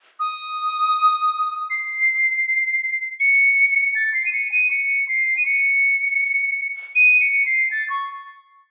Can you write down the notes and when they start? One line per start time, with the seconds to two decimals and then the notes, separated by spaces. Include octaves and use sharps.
0.20 D#6
1.70 C7
3.20 C#7
3.95 A6
4.14 C7
4.26 D#7
4.33 C#7
4.52 D#7
4.71 C#7
5.09 C7
5.37 D#7
5.46 C#7
6.95 D#7
7.21 C#7
7.46 C7
7.71 A6
7.90 C#6